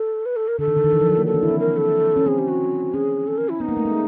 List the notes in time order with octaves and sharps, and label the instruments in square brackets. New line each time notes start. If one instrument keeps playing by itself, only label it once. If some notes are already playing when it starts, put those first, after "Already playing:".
Already playing: [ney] A4
B4
A4
A#4
[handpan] D3 [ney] A4
[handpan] D#3
D3
D#3
E3
F3
F#3
A#3
[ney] A4
[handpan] D4
E4
C4
[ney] A#4
A4
[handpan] C#4
[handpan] C4 [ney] G#4
[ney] G4
F#4
[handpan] C#4 [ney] G#4
[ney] A4
A#4
E4
[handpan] B3 [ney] D#4
[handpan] A#3
A3
G#3